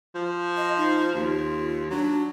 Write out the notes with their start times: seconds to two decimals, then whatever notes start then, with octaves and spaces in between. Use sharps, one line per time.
0.15 F3
0.57 D#5
0.77 D#4
1.14 D#2 F4
1.90 F#3 D4